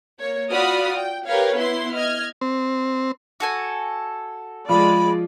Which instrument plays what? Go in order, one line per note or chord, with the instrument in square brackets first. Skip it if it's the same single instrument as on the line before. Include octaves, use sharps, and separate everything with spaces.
[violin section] A#3 C#5
F4 F#4 D5 B5 D#6 F6
G5
G4 A#4 B4 C#5 F5
B3 E4 C6
D#5 F6 G#6
[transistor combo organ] C4
[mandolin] F#4 A4 G#5
[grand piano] F3 F4 [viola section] G#3 D5 [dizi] B5